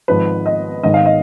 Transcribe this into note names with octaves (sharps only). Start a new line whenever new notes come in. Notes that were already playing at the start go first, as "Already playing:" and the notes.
G#1 G#2 F3 B4
D#5
G#1 G#2 D#3 D#5
F5
D#5